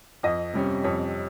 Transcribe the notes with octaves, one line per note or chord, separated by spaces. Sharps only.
F2 D#5
C3 G3 C#4
F2 C#5